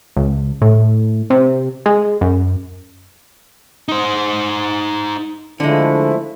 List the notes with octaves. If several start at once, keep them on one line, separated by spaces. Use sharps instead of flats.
C#2
A2
C3
G#3
F#2
D#4 C5
D3 F3 G#3 A3 E4